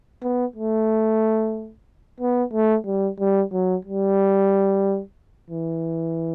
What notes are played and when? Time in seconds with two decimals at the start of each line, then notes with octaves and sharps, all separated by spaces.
0.22 B3
0.56 A3
2.20 B3
2.53 A3
2.86 G3
3.20 G3
3.52 F#3
3.85 G3
5.50 E3